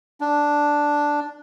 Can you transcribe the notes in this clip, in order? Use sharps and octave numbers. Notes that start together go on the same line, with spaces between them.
D4